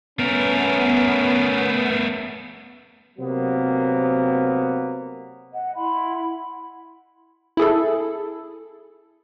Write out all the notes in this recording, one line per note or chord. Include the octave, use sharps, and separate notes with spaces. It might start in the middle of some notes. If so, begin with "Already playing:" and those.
A3 B3 C#4 A#4
C3 F#3 A#3 B3
D#5 F#5
E4 F#5 B5 C6
E4 G#4 A4